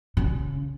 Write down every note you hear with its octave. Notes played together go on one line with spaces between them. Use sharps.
C#3